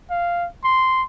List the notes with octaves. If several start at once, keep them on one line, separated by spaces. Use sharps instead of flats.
F5
C6